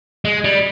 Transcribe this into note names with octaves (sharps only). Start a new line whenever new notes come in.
G#3
G3